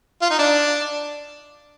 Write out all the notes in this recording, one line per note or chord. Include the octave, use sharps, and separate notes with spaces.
F4
D#4
D4